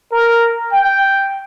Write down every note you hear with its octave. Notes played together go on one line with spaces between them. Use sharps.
A#4
G5